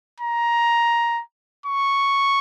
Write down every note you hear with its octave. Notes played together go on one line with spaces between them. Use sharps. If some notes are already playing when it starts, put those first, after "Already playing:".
A#5
C#6